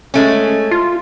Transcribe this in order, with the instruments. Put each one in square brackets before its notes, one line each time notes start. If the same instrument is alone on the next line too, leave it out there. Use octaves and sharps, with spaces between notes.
[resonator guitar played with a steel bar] G#3 A3 C#4
[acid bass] F4